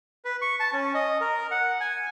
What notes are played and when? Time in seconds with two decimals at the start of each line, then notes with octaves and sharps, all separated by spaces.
0.25 B4
0.42 C#6
0.60 A5
0.73 C#4
0.94 D#5
1.21 A#4
1.51 F#5
1.80 G#5